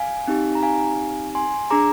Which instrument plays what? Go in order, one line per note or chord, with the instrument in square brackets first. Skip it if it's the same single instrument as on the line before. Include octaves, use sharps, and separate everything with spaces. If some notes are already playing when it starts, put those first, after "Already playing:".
Already playing: [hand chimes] F5 G#5
C4 D#4 G4
A#5
F5 G#5
G#5 C6
D4 G#4 A#5 D6